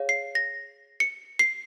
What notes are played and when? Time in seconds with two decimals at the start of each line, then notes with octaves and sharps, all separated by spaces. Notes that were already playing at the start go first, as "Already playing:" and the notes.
Already playing: G#4 C#5 F5
0.09 C7
0.35 A#6
1.00 C#7
1.39 C7